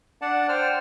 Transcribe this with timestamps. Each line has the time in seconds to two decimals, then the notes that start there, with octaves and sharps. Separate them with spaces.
0.22 D4 D5 F#5 A5
0.49 C5 G5 F6